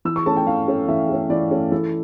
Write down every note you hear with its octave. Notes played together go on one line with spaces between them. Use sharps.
E3 E6
C#6
A3 C#4 A5
G5
E3 F5
A3 C#4
E3 E5
A3 C#4
E3 D5
A3 C#4
E3 A4